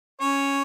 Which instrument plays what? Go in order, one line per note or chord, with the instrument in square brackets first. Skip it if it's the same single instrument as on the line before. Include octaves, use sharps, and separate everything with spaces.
[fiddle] C#4 [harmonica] C#5